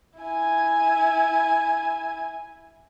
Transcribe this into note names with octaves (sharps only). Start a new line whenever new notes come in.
E4 G#5